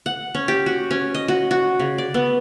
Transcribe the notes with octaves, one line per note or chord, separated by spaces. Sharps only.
F#5
C#4
G4
F#4
C#4
D#5
F#4
F#4
C#3
D5
B3